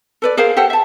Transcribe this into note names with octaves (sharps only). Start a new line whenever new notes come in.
A4 B4 D5
G#4 A#4 C5 F5
G4 A4 C5 F#5
E5 A5